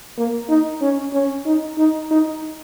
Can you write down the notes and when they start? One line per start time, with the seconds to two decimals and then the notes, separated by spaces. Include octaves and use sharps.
0.18 A#3
0.49 D#4
0.81 C#4
1.13 C#4
1.46 D#4
1.78 D#4
2.10 D#4